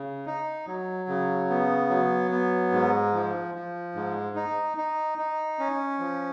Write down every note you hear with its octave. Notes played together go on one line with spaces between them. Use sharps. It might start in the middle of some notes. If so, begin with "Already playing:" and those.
Already playing: C#3
D#4
F#3
C#3
B3
F#3
B3
G#2
F3
F3
G#2
D#4
D#4
D#4
C#4
F3